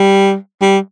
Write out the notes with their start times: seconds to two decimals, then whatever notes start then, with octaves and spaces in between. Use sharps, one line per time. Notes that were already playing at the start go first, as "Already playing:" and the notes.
Already playing: G3
0.62 G3